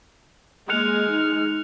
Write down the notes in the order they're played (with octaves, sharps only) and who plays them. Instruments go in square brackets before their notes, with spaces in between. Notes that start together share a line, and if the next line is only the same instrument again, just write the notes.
[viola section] G#3 [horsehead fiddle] A#3 [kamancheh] F6 [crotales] F#6 C#7 F7
[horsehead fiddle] D#4